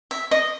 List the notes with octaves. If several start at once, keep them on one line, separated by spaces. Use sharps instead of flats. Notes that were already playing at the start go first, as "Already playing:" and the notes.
E5
D#5